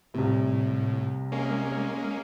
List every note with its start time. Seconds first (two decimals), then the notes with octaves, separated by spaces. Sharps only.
0.14 C2 A2 C3
1.32 G#3 A#3 C#4